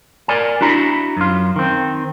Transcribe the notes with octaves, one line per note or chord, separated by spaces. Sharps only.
A#4 D5 G#5
D4 E4 F#4 A#5 B5
F#2 F4
D#3 C4